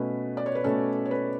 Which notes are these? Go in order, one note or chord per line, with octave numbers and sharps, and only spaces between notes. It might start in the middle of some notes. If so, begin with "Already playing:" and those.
Already playing: B2 A3 C#4 B4
D5
C#5
B4
B2 A3 C#4 A4
C#5
B4